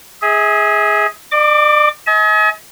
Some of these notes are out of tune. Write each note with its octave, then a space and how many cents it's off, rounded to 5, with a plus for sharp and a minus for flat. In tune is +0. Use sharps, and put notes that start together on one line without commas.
G#4 +0 E5 -40
D5 +40 D6 +0
D#5 +40 G#5 +35